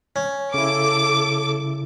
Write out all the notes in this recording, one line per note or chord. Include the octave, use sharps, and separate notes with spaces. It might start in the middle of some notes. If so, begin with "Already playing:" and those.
C#4
C#3 E4 A4 D6